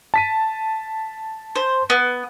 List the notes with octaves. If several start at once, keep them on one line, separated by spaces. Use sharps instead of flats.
A5 B6 D#7
C5
B3